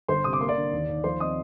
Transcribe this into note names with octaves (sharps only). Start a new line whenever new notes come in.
G1 C5 C6
C3 D#6
D6
A#3 C6
D5 D6
D3
D#2
D#2
F3 C5 C6
C4 D#5 D#6